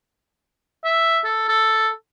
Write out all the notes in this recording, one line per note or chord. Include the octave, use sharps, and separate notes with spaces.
E5
A4
A4